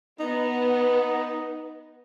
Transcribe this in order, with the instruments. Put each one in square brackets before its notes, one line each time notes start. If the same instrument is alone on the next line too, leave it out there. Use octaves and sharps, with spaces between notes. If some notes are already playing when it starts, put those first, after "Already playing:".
[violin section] B3 [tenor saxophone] D#4